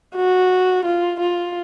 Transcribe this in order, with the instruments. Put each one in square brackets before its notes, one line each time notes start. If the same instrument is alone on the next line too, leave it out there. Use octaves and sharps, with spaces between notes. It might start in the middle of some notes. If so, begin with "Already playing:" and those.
[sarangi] F#4
F4
F4